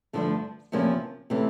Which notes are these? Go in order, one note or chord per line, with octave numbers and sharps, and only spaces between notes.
G2 D3 F3 A3 D4
E2 C3 F3 A#3 C#4
C3 E3 A3 C#4